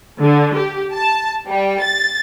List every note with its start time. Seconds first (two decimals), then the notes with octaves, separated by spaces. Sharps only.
0.20 D3
0.56 G4
0.94 A5
1.47 G3
1.81 A6